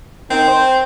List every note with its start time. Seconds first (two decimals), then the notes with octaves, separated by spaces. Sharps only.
0.30 D#3 C4
0.48 C5